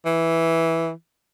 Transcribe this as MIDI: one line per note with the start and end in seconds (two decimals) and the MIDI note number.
0.05 0.91 52